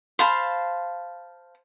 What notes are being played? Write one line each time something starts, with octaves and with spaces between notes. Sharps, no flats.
C5 F5 A5 B5